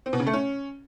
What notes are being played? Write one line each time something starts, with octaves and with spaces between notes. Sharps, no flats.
C4
B2
C#3
A3
C#4